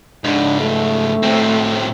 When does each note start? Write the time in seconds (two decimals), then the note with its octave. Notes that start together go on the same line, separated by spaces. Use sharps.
0.24 G#2 C#3 D4
0.60 A3
1.22 A2 C4